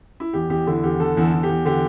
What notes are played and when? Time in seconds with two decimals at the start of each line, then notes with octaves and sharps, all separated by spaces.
0.20 E4
0.33 E2 G4
0.49 E2 G4
0.67 D3 E4
0.83 E2 G4
1.00 D3 A4
1.17 E2
1.22 A4
1.33 E2
1.43 G4
1.49 E2
1.65 D3 G4